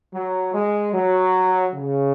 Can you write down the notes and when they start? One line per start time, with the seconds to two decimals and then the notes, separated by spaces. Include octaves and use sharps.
0.13 F#3
0.54 G#3
0.93 F#3
1.73 C#3